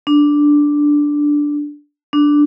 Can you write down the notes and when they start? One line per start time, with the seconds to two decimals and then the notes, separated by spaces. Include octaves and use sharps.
0.07 D4
2.13 D4